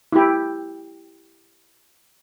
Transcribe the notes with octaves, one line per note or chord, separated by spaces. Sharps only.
E4 G4